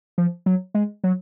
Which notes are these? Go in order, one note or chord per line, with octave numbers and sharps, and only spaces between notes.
F3
F#3
G#3
F#3